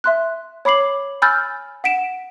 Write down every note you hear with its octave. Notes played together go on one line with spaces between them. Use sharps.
E5 C6 F#6
C#5 B5 D6 C7 F#7
G#5 B5 E6 F6 G6 A6
F#5 B6 D7 E7